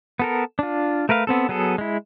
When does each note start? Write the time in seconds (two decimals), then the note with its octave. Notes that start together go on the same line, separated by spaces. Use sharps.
0.20 B3 A4 A#4
0.59 D4 F4
1.09 A3 A#4 B4 F5
1.27 B3 C4 A4
1.49 F#3 B3 G#4 A4
1.78 G#3 E4